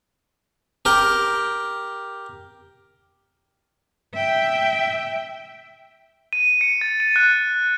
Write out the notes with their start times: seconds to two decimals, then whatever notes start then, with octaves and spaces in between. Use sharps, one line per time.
0.85 G4 A#4 G5
4.14 E5 G5
6.33 D#7
6.61 C#7
6.81 A6
7.00 D#7
7.16 F#6